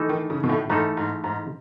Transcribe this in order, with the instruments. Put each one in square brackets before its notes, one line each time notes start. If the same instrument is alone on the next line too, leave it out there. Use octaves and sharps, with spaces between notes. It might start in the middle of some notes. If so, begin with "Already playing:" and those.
Already playing: [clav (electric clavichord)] E3 A3 D#4 A4
[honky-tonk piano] D#3
C#3
B2
A2
[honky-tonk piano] G#2 [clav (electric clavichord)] E3 A3 D#4 A4
[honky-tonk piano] G#2
G#2